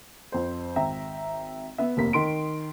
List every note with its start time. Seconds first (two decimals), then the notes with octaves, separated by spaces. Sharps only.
0.32 F2 C5
0.76 G#1 E5 G5 A#5
1.78 B3 E5
1.97 F1 D#2 A#3 B6
2.13 D#3 C6 D7